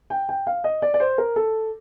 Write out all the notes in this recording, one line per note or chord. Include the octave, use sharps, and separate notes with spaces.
G5
G5
F5
D#5
D5
D5
C5
A#4
A4